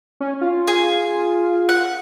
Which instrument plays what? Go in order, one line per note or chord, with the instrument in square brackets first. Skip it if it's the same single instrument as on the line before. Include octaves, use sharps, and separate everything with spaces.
[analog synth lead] C#4
F4
[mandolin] G#4
F#5